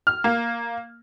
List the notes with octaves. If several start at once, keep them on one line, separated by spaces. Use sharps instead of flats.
F6
A#3